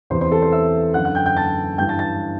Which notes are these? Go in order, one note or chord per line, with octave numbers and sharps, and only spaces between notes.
E2 C3 E3 C5 C6
C5 C6
A4 A5
C5 C6
E5 E6
F#2 D3 F#5 F#6
F#5 F#6
G5 G6
G5 G6
A5 A6
G2 E3 G5 G6
A5 A6
A5 A6